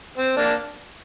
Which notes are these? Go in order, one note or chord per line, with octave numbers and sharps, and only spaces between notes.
C4
A#3 D4